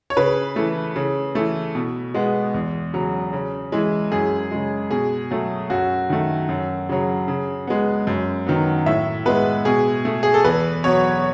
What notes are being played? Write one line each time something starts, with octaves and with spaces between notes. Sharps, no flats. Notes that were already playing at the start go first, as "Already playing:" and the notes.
C#5
C#3 B4
E3 A3
C#3
E3 A3
B2
G#3 B3
E2
C#3 F#3
C#3
E3 G#3
F#2 G#4
C#3 G#3
B2 G#4
F#3 A3
F#2 F#4
D#3 A3
F#2
C#3 F#3
C#3
G#3 B3
F#2
D#3 F#3 B3
A2 E5
G#3 B3 B4
B2 G#4
A3
G#4
A4
E2 B4
B2 F#3 B3 C#5